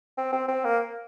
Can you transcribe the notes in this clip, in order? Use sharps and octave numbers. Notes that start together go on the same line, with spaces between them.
C4
C4
C4
A#3